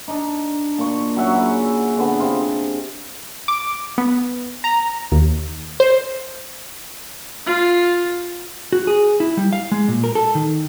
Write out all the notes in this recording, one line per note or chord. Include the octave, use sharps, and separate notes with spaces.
D4 D#4
A#2 C#6
F#3 C#4 E5 F#5
E4 G#4
D3 B3
C3 F4
D6
B3
A#5
D#2
C5
F4
F#4
G#4
E4
G3
F5
G#3
A#2
A#4
A4
D#3